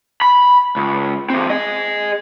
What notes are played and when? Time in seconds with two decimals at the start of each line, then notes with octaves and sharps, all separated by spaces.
0.22 B5
0.76 C#2
1.30 E3 C4
1.50 G#4 D#5